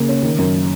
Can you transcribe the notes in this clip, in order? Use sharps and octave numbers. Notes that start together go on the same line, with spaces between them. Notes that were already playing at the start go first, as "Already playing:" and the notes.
Already playing: C#3 A#3
C#4
D#3
F#2